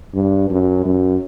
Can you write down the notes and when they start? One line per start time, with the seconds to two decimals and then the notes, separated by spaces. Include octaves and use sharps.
0.14 G2
0.50 F#2
0.85 F#2